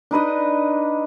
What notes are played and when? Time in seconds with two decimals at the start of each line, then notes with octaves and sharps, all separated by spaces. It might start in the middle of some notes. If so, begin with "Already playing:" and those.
0.11 D4 D#4 B4 D#5